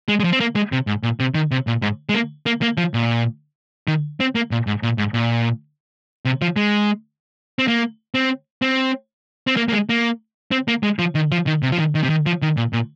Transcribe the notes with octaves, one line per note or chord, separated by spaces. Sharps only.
G#3
G#3
F3
C4
A#3
G#3
C3
G#2
A#2
C3
D#3
C3
A#2
G#2
G#3
A#3
A#3
A#3
F3
A#2
D#3
C4
A#3
A#2
G#2
A#2
G#2
A#2
C3
F3
G#3
C4
A#3
C4
C4
C4
A#3
A#3
G#3
A#3
C4
A#3
G#3
F3
D#3
F3
D#3
C3
F3
D#3
D#3
C3
D#3
F3
D#3
A#2
A#2